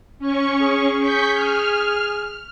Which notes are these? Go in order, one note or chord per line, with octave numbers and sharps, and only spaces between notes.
C#4 C#6
G#4
C#6 G6 B6
F6